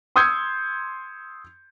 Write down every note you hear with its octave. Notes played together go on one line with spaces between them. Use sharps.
C6 D#6 E6 G6 G#6 C#7